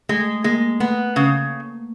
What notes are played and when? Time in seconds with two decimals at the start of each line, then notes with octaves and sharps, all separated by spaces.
0.09 G#3 A3
0.44 G#3 A#3
0.80 A3 B3
1.16 C#3